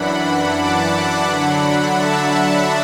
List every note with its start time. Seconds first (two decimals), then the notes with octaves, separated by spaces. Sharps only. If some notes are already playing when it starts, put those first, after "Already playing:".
Already playing: F#2 E3 D4 F#5 B5
0.20 F#5 B5
0.54 A5 D6
0.89 F#5 B5
1.24 D3 F#3 D4
1.59 F#5 B5
1.93 E5 A5
2.29 E5